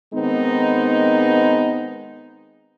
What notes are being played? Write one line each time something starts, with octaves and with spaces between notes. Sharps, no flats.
D#3 G#3 B3 C4 D#4